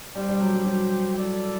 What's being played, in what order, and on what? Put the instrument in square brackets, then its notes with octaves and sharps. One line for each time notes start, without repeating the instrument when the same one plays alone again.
[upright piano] G3 [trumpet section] D4 G4 C5 G5
[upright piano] G3
F#3
G3
F#3
[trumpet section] E4 A4 D5